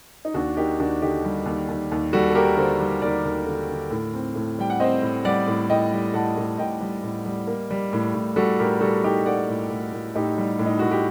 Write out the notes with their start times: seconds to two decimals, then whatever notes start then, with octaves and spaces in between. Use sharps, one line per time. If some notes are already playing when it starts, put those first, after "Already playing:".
0.25 D#4
0.34 D#2 D4 F#4
0.57 A#3 D#4 G4
0.79 D#2 D4 F#4
1.01 D3 D#4 G4
1.25 G3
1.46 D#2
1.68 D#2
1.91 D#2
2.13 G3 F#4 A4
2.28 A4
2.35 A#3 G4 A#4
2.57 D3 A4 C5
2.80 G3
3.02 D#2 A#4 D5
3.25 D#2
3.46 D3
3.69 D3
3.91 A2
4.14 C4
4.35 A2
4.59 G3 G5
4.70 F#5
4.80 C4 C5 D#5
5.02 A2
5.25 G3 D5 F#5
5.47 A2
5.70 A2 D#5 G5
5.92 G3
6.13 A2 F#5 A5
6.37 A2
6.58 A2 D#5 G5
6.81 G3
7.03 A2
7.26 G3
7.47 A#3
7.70 G3
7.93 A2
8.14 A2
8.36 G3 F#4 A4
8.59 A2 G4 A#4
8.81 G3 F#4 A4
9.03 G3 D#4 G4
9.26 A#3 D5 F#5
9.49 A2
9.70 A2
9.93 A2
10.15 A2 D#4 G4
10.38 G3
10.59 A2
10.66 D#4
10.79 A2 F#4
10.91 G4